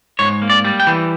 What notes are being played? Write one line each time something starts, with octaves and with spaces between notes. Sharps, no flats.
G#2 C#5
A#3
D5
G3
G5
E3